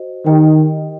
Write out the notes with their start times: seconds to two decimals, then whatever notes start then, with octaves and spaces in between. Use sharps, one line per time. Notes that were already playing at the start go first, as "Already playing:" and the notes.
Already playing: F#4 C5 D#5
0.26 D#3 G4 D#5 G5